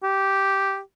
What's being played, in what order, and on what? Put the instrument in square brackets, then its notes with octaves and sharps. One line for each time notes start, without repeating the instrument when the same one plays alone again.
[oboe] G4